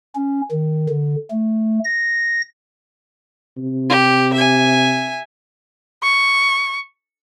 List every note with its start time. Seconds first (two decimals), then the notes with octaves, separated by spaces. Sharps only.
0.15 C#4
0.51 D#3
0.89 D3
1.30 A3
1.84 A#6
3.57 C3
3.90 G4
4.33 E5 G#5
6.03 C#6